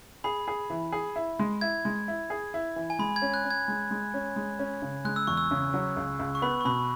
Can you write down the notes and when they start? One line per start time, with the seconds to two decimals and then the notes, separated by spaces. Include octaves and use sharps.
0.24 G#4 B5
0.48 G#4
0.70 E3
0.92 G#4
1.16 E4
1.39 G#3
1.61 E4 G#6
1.85 G#3
2.08 E4
2.30 G#4
2.54 E4
2.76 E3
2.90 G#5
2.99 G#3 B5
3.16 G#6
3.22 C#4
3.34 F#6
3.44 C#4
3.51 G#6
3.68 G#3
3.91 G#3
4.14 C#4
4.36 G#3
4.59 C#4
4.82 C#3
5.05 G#3 F#6
5.16 E6
5.27 E2 C#6
5.37 E6
5.51 C#3
5.74 F#3
5.97 C#2
6.19 C#2
6.35 C#6
6.42 B3 B5
6.61 C#6
6.65 B2 B5